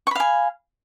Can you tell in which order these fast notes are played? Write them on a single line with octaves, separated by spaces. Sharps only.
C#6 B5 F5 G#5